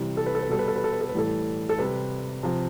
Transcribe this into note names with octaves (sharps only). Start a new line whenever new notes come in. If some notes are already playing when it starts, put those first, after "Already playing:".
Already playing: C3 E3 G3
A4
B4
A4
B4
B2 G3 A4
B4
A4
B4
A4
B4
A4
B4
A2 E3 G3 A4
A4
C3 G3 B4
C3 F3